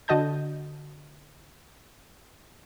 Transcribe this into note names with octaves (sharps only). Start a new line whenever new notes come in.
D3 F#4 D#5 A5 G6